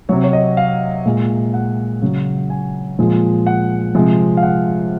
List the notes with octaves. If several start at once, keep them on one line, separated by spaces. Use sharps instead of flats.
C3 F#3 C#5
C#5
D#5
F5
A#2 G#3
F#5
C#3 F#3
G#5
A#2 F3 G#3
F#5
C3 F3 G#3
F5
F#5